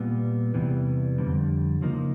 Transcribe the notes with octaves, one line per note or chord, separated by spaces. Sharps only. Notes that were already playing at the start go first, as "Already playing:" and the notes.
Already playing: A#2 G3 B3
E2 C3 E3 G3 B3
F2 D3 G3
C#3 F3 A#3 D#4